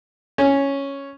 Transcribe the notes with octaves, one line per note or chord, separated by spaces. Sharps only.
C#4